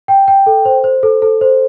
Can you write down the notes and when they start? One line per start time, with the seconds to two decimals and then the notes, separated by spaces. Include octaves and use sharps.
0.08 G5
0.28 G5
0.46 A4
0.65 C5
0.84 C5
1.03 A4
1.22 A4
1.41 C5